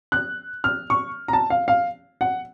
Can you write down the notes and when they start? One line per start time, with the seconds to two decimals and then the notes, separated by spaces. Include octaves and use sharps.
0.12 F#6
0.64 F6
0.90 C#6
1.28 A#5
1.33 A5
1.50 F5
1.68 F5
2.21 F#5